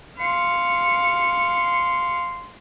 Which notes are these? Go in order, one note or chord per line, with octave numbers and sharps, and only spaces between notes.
F5 C6 C#7